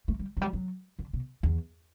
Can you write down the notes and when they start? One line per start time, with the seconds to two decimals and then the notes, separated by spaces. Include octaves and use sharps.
0.08 A3
0.19 G3
0.37 F#3
0.41 G3
0.53 F#3
0.99 D3
1.13 B2
1.43 E2